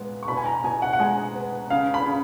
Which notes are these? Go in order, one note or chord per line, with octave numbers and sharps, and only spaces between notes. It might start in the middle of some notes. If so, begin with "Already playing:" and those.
Already playing: A#2 G#3 B3
C#6
B2 B5
G#5
A#5
B2 G#5
F#5
F#5
G#3 G#5
B3
C#3 F5
B5
C#3